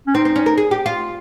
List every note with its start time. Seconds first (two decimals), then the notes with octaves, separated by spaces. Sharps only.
0.07 C#4
0.15 C4 D#4
0.25 C4
0.36 C#4
0.46 A#4
0.58 G#4
0.71 G4
0.86 F4